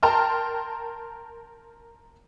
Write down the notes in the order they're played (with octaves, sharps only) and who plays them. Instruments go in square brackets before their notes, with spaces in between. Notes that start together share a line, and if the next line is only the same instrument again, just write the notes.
[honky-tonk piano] A#4 G5 A5 A#5 C6 F6